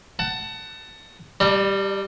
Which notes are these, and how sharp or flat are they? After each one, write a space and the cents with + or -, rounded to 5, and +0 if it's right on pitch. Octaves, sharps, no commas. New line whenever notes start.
F#5 +20 A5 +10
G3 +0 D4 +45